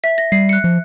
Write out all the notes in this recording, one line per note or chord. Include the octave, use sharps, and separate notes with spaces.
E5
A#6
G3 C7
F#6 C#7
F3